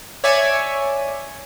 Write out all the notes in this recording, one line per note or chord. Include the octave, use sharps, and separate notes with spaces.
C#5 D5 E5 G#5